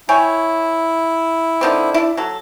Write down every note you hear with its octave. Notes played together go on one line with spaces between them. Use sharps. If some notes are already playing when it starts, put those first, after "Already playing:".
E4 C#5 G5 G#5
D3 D#3 C4
D4 E4
F#3 A4